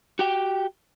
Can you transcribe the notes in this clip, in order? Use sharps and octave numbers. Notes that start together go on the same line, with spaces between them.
F#4 G4 G5